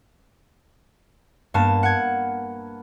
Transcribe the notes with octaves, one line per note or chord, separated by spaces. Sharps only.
G2 A#3 B3 A5
F#5 G#6